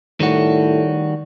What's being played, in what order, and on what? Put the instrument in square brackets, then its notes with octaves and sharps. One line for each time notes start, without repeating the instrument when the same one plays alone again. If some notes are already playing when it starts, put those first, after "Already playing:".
[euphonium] A2 [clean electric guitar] D#3 G3 F#4